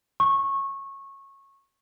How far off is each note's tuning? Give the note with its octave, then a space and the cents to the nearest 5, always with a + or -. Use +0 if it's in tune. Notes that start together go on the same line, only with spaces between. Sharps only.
C#6 -20